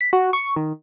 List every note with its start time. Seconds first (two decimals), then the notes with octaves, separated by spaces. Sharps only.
0.01 B6
0.13 F#4
0.33 C#6
0.56 D#3